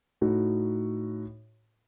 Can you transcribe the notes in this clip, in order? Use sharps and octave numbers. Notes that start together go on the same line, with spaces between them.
A2 D#4 F#4